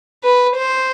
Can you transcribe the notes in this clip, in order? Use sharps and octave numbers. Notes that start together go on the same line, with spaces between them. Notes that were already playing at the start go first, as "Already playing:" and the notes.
B4
C5